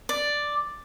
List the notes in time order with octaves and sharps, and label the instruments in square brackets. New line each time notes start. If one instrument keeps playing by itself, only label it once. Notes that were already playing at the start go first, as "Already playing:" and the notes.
[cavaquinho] D5